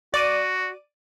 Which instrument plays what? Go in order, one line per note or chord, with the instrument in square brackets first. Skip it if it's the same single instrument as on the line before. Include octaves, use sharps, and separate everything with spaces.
[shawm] F#4 [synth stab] D5 D6 D#7